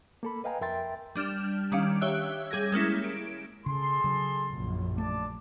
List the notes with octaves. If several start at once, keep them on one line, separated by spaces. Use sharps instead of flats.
A#3 A4 B5
B4 D#5 F5 G5 G#5 A#5
F2 A#4 E5 G5 C6 A6
G3 D4 F6 G6 E7
D#3 G3 C#4 F5 D7
G4 C#5 E5 E6 F#6
G3 G#4 G#6 A#6
G#3 A#3 C#4 E4
D7
C#3 G#4 A4 C6
C#3 F#3
A#1 F#2
A3 D4 A5 D6